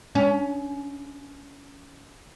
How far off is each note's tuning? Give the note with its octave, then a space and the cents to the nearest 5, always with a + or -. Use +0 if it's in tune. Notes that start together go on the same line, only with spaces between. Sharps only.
C#4 +20